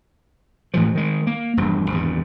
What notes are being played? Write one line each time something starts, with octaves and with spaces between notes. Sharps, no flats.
A2 E3 F3
D#3 G#3
A#3
E1 G2 F3
G#1 E2 G2